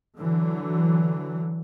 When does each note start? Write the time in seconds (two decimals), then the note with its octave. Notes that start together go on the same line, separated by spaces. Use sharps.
0.17 D3 E3 F#3